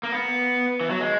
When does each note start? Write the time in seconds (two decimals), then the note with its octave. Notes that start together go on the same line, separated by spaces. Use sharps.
0.03 A#3
0.12 B3
0.81 E3
0.90 F#3
1.00 G#3